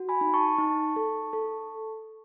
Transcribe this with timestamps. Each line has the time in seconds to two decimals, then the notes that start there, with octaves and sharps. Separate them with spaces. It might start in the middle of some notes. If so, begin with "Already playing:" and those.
Already playing: F#4
0.09 G#5 B5
0.21 D#4
0.34 A5 C#6
0.58 D#4
0.96 A4
1.33 A4